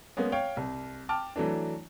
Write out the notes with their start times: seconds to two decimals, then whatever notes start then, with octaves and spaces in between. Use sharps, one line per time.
0.17 G#3 A#3 B3 C#4
0.32 C#5 F5 G5
0.57 C2
1.09 G5 A5 D6 F6
1.36 E3 F#3 A3 D4